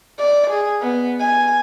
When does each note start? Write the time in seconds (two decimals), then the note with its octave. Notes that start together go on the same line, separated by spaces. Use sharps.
0.19 D5
0.50 G#4
0.82 B3
1.20 G#5